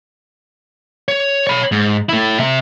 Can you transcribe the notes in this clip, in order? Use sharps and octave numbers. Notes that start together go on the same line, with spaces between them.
C#5
C#5 B5
G#2
A3 E4
C3 E5